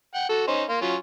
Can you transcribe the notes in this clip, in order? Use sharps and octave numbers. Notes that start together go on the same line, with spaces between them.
F#5 G5
F#4 A4
C#4 D#4 C5
A#3 F5 C6
F#3 C#4 F4